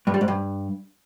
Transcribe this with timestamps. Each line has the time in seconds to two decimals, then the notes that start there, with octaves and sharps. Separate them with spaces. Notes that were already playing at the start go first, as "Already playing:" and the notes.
0.07 G2
0.14 G3
0.21 G#2
0.28 G2